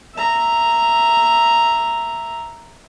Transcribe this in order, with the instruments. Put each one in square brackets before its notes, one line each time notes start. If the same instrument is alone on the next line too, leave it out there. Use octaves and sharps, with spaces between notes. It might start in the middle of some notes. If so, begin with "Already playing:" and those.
[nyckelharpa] E5 A#5